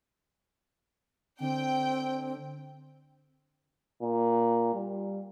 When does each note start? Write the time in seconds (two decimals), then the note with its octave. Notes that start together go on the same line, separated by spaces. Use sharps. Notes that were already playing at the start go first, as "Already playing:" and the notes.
1.40 D3 C4 G5
4.02 A#2
4.74 G3